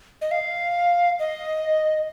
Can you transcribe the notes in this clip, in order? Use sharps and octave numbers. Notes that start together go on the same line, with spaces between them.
D#5
F5
D#5